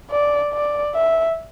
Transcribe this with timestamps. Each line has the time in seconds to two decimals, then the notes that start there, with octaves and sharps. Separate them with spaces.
0.11 D5
0.53 D5
0.95 E5